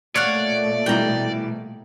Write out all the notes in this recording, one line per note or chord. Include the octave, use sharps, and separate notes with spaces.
A#2 A3 C#5 D5 F5 F#5
B2 E3 G3 G5 A#5